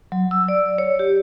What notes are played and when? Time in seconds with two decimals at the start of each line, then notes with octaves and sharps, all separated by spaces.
0.12 F#3
0.31 E6
0.48 D5
0.78 C#5
0.99 G4